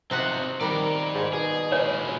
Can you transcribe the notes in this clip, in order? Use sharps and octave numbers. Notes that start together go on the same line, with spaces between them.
C3 C4 D#4 F4 F#4 F#5
D#3 G3 A#4 D5
G#2
B2 G#4
A#2 G#3 E4 C#5